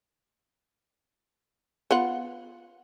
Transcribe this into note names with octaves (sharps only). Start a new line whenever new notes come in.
B3 F4 F#5